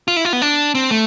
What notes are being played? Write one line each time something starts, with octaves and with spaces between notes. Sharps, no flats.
F4
E4
F4
B3
D4
C4
A3